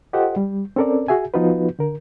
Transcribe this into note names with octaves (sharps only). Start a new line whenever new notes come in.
F4 G4 A4 C5 D#5 F#5
G3
C4 C#4 A4 A#4 D5
F#4 G#4 E5 G#5
F3 B3 D#4 F4 F#4 B4
D3 A#4